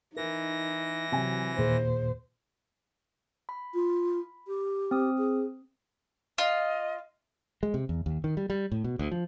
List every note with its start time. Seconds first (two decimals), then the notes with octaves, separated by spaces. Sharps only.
0.16 E3 D#4 A#4 A#6
1.12 C3 F#3 G#5
1.58 D#2 A#2 G#4 C5
3.49 B5
3.74 F4
4.48 G4
4.91 C4 D#6
5.18 G#4
6.38 F4 D#5
7.63 G#3
7.74 C3
7.89 E2
8.06 D#2
8.24 D#3
8.37 G3
8.50 G3
8.72 A2
8.84 B2
8.99 D2
9.12 F3